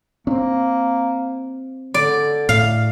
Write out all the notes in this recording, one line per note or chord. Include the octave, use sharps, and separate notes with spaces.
A#3 C4 C#4
D3 D5
A2 F5